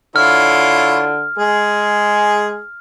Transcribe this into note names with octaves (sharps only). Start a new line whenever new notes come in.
D3 E4 F4 C#5 F6
G#3 G#4